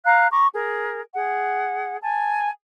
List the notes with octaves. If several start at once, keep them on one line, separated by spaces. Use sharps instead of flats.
F5 A#5 F#6
A#5 C#6 D6
G#4 A#4
G#4 F#5
G#5 A5